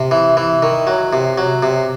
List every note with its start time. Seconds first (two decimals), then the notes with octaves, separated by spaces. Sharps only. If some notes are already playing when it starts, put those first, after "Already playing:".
Already playing: C3
0.11 E3
0.37 E3
0.63 D#3
0.87 F#3
1.13 C3
1.38 F#3
1.63 C3